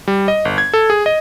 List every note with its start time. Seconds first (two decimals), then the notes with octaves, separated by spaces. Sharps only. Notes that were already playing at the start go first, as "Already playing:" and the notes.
0.08 G3
0.28 D#5
0.45 G1
0.58 G#6
0.74 A4
0.90 G#4
1.06 D#5